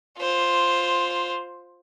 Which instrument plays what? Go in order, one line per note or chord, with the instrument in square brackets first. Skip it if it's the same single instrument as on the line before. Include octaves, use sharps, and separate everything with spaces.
[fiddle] F4 C5